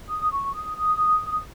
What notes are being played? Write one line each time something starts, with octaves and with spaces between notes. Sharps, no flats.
D#6
C#6
D#6
D#6